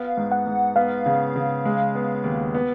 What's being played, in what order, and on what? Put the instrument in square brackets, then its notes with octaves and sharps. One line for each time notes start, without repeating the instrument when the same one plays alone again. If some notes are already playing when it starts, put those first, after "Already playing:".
Already playing: [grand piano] B3 [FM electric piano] F5
[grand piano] G#2
[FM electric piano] F#5
[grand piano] G#2
[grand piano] B3 [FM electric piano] F5
[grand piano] C#3
C#3
G#3
B3
D#2
B3